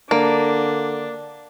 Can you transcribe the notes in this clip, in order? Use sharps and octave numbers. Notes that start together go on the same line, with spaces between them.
D3 A#3 D4